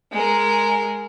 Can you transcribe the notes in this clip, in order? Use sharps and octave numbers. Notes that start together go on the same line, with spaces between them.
G#3 A#4